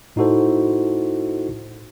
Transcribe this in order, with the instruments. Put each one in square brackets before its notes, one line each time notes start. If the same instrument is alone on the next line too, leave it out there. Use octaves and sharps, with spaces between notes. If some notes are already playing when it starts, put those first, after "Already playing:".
[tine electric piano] A2 D#4 E4 F#4 A4 C5